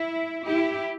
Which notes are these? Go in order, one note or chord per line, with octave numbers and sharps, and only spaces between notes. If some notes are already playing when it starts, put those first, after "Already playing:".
Already playing: E4
E4 G4